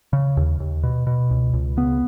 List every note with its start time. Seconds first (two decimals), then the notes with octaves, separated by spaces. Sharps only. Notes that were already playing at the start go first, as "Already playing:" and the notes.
0.13 C#3
0.37 D#2
0.60 D#2
0.83 B2
1.07 B2
1.30 C#2
1.53 C#2
1.77 C#3 B3